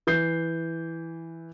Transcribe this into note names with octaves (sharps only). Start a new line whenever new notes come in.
E3 G6 C7